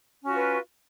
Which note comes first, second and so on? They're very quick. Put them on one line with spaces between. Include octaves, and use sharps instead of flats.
C#4 F#4 F4 B4